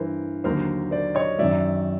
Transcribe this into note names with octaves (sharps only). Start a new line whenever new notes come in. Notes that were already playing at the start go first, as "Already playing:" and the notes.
Already playing: G2 E3 A#4 C5
D#2 D3 F#3 A#4 C5
C5 D5
C#5 D#5
F#2 D#3 F#3 D5 E5